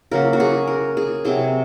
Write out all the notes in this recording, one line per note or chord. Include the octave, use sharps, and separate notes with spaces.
C#3 F#3 A#3 A#4
F#4
G#4
A#4
G#4
C3 F#3 C4 G#4